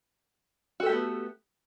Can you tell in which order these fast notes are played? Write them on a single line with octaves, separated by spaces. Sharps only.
F#4 A4 G4 A3 B3